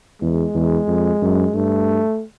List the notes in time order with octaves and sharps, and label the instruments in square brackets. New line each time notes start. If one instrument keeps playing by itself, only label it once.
[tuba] E2 [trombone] G#3
[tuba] E2
F2
F#2
[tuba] G2 [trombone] A3